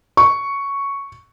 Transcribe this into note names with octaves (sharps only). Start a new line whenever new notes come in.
C#6